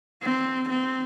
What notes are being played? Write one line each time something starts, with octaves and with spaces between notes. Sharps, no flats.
C4
C4